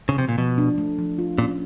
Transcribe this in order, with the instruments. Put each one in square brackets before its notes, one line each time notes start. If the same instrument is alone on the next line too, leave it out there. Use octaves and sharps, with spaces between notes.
[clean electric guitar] C#3
[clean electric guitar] C3 [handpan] F3
[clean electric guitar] A#2
[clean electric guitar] B2 [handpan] F3
[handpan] D4
A3
F3
F4
[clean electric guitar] A#2 [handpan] C#4